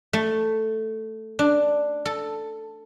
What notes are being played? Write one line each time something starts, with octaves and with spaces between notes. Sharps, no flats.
A3
D4
A4